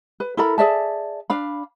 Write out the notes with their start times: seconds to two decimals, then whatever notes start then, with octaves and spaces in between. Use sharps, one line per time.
0.20 B4
0.37 E4 A4 A#4 B5
0.58 G#4 D5 E5 A5
1.30 D4 F5 B5